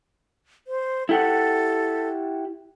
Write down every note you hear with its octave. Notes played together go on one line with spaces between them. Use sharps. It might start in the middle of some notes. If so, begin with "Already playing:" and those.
C5
E4 G4 A4 F#5